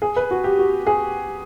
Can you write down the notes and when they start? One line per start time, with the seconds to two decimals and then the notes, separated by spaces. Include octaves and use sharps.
0.02 G#4
0.16 B4
0.31 F#4
0.44 G4
0.59 F#4
0.87 G#4